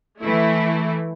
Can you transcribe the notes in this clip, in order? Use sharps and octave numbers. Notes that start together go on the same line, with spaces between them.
E3 A3 E4